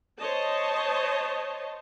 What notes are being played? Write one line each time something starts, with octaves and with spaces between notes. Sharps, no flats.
C5 C#5 D#5 A5